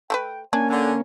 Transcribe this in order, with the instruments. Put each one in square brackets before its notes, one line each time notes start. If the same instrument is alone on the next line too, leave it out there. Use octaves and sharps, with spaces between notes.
[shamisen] A3 A4 B4 [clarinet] G5
[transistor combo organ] A#3 C#4 [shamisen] D4 [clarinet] G#5
[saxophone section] D3 [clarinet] G#5